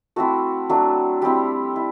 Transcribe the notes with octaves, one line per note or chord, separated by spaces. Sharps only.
A3 C4 E4 F#4
F#3 A3 D4
G3 C4 E4 G4
E4